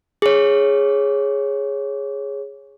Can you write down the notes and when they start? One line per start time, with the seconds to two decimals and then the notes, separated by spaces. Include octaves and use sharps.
0.22 G#4 C#5